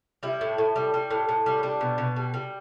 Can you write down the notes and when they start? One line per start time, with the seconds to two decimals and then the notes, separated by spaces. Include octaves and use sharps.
0.23 G3 E4
0.41 A2
0.58 A2
0.76 G3
0.94 G3
1.10 A2
1.29 A2
1.46 G3
1.63 G3 D4
1.81 B2
1.98 B2
2.16 G3
2.34 G3